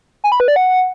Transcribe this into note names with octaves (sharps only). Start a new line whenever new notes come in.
G#5
B5
B4
D5
F#5